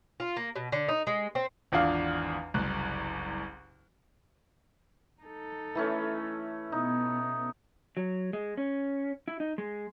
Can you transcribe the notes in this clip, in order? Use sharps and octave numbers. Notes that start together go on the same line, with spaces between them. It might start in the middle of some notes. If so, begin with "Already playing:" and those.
F4
A#3
B2
D3
D#4
G#3
C4
G#1 E2 D4 F4 F5 D#6
F#1 C2 F#6
D#4 A4
E3 A3 C#4
B2 B3 D#4
F#3
G#3
C#4
E4
D#4
G#3